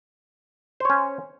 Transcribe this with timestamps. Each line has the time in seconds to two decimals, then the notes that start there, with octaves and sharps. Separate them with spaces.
0.80 C5
0.85 C#5
0.90 C#4